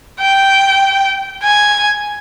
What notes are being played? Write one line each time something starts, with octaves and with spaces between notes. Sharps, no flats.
G5
G#5